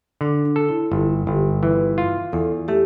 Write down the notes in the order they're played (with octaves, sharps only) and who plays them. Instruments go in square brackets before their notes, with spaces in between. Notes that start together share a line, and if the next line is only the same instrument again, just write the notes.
[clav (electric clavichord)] D3 [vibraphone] D4
[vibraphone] D4
[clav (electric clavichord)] A4
[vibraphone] E4
[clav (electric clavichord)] G1 [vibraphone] E4
[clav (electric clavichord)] G1 [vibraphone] G4
[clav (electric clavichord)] E3 [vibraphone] B4
[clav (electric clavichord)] F4
[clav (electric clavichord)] E2 [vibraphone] A4
[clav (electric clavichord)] A3 [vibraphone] G4